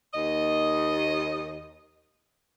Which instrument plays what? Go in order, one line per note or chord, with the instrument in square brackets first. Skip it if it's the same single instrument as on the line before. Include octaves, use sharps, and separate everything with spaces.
[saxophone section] D#2 D#5